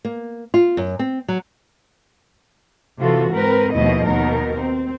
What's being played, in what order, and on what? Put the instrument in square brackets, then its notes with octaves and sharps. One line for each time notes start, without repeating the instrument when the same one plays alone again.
[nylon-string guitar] A#3
F4
F#2
C4
F#3
[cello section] C3 E3 F4 F#4 A4
G#2 C4 A#4 B4
D#2 B2 F3 A3 E4 D#5
D#2 B2 B3 D#4 A#4
C4